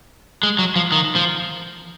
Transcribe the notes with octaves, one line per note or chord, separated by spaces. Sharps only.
G#3
F#3
F3
D#3
F3